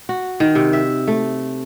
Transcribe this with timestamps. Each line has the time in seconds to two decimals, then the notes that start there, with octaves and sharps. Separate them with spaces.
0.09 F#4
0.40 D#3
0.55 C3
0.73 E5
1.08 A3